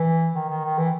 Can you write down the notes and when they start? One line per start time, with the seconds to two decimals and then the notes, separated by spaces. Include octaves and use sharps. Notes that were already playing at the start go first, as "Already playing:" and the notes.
Already playing: E3
0.36 D#3
0.50 D#3
0.65 D#3
0.78 E3